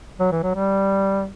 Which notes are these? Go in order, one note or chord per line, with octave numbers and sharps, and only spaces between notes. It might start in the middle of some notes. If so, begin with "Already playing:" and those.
F#3
E3
F#3
G3